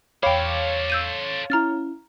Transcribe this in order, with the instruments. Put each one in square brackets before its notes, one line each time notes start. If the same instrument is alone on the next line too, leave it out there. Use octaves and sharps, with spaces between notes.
[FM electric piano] E2 D6 [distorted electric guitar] A4 C5 [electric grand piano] C#5 F5 [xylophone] G5 B5
[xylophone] E6 G6 D#7
[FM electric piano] C#4 E4 [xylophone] A#5 F6 A6